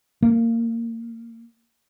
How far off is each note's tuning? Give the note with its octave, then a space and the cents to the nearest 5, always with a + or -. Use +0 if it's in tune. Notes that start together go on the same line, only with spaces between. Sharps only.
A#3 -20